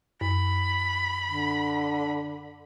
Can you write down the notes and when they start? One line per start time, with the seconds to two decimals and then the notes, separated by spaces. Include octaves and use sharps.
0.21 F#2 B5
1.27 D3